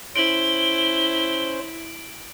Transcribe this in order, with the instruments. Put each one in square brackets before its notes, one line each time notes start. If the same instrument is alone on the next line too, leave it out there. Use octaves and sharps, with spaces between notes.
[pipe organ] C#4 C5 [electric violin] E4 [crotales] D7 F#7 [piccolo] G7